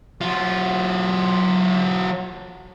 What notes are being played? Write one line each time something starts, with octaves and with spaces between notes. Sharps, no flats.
F#3 F4